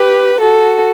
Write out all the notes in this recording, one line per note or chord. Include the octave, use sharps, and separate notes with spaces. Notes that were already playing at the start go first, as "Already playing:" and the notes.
Already playing: G4 B4
F#4 A4